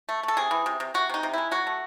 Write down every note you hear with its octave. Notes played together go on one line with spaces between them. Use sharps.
A3
A3 A4
C3 G#4
E3
C3
C3
C3 F#4
C3 D#4
C3
G#3 E4
F#3 F#4
A3